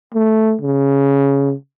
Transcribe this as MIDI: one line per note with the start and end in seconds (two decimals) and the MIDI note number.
0.14 0.55 57
0.61 1.53 49